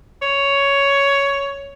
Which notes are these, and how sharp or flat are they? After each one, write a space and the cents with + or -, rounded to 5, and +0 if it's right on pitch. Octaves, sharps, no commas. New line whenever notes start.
C#5 +10